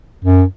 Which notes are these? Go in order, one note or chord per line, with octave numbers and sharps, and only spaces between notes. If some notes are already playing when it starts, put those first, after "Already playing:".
F#2